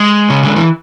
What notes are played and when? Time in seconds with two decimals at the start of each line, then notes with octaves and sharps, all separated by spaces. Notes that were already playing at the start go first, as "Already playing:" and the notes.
Already playing: G#3
0.30 C#3
0.43 D3
0.56 E3